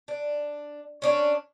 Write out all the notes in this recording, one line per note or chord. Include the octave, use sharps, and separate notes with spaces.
D4
C#4 D4 C#5